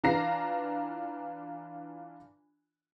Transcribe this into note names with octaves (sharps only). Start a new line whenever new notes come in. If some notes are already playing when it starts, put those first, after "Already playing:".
E3 D4 F4 A#5 A#6 C7